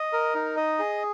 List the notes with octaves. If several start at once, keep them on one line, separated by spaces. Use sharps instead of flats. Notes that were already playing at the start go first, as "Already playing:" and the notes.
Already playing: D#5
A#4
D#4
D#5
G#4